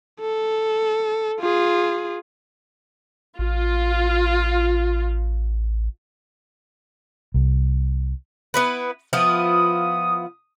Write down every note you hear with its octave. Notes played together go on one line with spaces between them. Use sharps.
A4
F4 G#4
A1 F4
C2
B3 E4 B4
F3 B3 E4 D#6